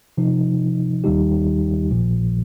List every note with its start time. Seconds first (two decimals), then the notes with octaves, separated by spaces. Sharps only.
0.17 C3 F3 D#4
1.04 D#2 D#3 G3 D#4 G4
1.89 A#1 A#2 F3